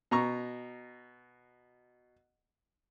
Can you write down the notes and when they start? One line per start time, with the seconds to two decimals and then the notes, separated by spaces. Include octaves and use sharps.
0.11 B2 A#5 C#6